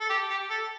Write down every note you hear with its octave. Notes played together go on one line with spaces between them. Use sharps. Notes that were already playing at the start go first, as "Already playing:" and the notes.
A4
G4
G4
A4